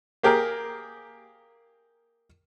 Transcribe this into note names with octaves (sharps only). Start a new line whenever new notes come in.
A#3 G4 G#4 A#4